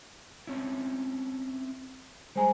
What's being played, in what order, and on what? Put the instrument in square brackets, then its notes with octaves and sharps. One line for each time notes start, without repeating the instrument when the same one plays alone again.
[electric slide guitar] C4 C#4 E4
[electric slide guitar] G3 G#3 [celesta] C5 G#5 A#5